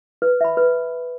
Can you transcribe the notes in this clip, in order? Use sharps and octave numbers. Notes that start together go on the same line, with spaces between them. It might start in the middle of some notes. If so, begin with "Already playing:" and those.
B4
E5 B5
B4